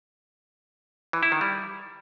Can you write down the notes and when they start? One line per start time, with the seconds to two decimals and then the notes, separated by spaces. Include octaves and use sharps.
1.13 E3
1.23 E4
1.32 D#3
1.41 G3